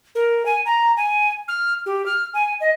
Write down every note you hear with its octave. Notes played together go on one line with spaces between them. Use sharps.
A#4
G#5
A#5
G#5
F6
G4
F6
G#5
D#5